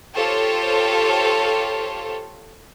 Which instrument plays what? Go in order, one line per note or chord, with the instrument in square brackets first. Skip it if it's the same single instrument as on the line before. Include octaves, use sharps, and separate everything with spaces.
[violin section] F4 G4 A4 C5 C#5